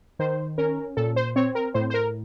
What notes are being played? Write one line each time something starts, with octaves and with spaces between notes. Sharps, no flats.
D#3 C5
C#4 A#4
A#2 A4
C5
C4 C#5
A#4
A2 C5
C5
A#4